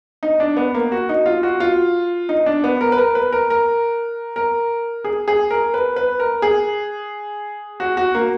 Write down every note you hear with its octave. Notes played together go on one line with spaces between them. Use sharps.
D#4
D4
B3
A#3
F#4
D#4
F4
F#4
F4
D#4
D4
B3
A#4
B4
A#4
B4
A#4
A#4
A#4
G#4
G#4
A#4
B4
B4
A#4
G#4
F#4
F#4
A#3